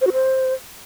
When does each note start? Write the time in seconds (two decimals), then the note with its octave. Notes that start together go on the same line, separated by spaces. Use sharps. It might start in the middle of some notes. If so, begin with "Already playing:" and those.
0.01 C5
0.07 F#4
0.13 C5